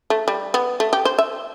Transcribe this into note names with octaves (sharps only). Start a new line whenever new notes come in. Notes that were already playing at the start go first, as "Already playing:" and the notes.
A3
G3
B3
A3
G4
C5
E5